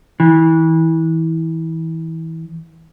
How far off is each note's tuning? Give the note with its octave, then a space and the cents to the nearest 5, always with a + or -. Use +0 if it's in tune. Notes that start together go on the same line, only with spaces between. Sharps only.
E3 -25